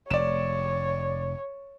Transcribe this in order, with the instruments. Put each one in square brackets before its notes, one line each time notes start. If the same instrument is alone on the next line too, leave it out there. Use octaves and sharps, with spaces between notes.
[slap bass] F1 [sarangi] C#5 [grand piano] D5 E7